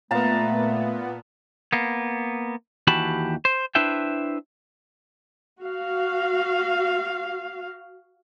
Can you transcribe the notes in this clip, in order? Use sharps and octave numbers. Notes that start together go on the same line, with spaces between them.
A#2 A3 B3 F5 A5 A#5
A#3 B3
D#2 E3 F#4 G4 A5 B5
C5
D4 E4 B4 C5 E5 G5
F#4 F5